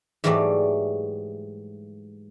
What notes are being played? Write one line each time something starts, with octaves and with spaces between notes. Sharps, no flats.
G#2 E3 F#3 G3 A3 D5